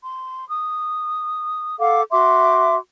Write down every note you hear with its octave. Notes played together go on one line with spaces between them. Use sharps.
C6
D#6
A4 F5 F#5 D6
F#4 E5 C6 D6